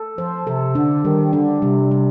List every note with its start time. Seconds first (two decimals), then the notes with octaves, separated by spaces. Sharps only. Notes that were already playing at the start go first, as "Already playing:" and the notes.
Already playing: A4
0.18 F3 C5
0.47 C3 A4
0.75 D3 D4
1.04 D#3 G3
1.33 D3 D4
1.62 C3 G3
1.91 G3